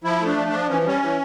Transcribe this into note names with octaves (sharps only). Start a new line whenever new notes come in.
F3 E4
A3
D4
F3
D4
F3
E3 C#4
G3 C#4
E3